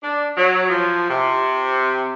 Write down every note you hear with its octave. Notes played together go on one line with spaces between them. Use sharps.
D4
F#3
F3
C3